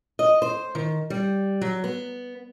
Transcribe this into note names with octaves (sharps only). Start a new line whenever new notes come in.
D#5
C5
D#3
G3
F#3
B3